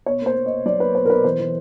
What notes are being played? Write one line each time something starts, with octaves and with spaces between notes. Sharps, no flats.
B2 C#5
A#3 C5
A#3
D#5
B2
F#3 D5
A#3 B4
B2 C5
A#4
B2 B4
E3 C5
E3